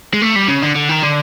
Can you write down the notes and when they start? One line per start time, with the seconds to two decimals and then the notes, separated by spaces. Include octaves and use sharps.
0.14 G#3
0.22 A3
0.36 G3
0.48 C#3
0.62 D3
0.75 D3
0.89 D#3
1.03 D3